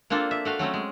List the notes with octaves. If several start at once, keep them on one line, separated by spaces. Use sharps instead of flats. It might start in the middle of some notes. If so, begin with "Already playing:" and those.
A#3 C4 D4 F4 A4
E5
A3 F#4 F5
F#3 A3 C4 C#4
G#3